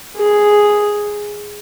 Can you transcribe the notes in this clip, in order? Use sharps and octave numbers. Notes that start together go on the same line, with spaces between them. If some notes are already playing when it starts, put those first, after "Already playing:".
G#4